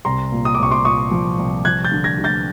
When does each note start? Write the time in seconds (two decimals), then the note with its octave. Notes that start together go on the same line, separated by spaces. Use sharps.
0.05 C2 A#5 C6
0.32 A#2
0.45 D#6
0.55 D6
0.59 C2 C#6
0.71 C6 D6
0.85 A#2 C#6 D#6
1.11 F3
1.38 C2
1.65 F3 F#6 G#6
1.84 G6 A6
1.92 D3
2.04 G#6 A#6
2.19 D3
2.24 G6 A6